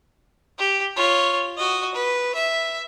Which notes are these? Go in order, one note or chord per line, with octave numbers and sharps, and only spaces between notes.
G4
F4 C#5
F#4 D#5
B4
E5